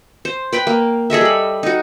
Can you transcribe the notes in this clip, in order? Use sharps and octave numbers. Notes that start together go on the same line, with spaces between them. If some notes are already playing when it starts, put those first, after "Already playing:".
C5
B4 G5 B5
A#3
G#4 A4 D#5 E5
G3 B5
D#4 F#4